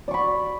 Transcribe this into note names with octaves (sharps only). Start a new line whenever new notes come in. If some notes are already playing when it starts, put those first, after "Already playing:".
D5 B5 C#6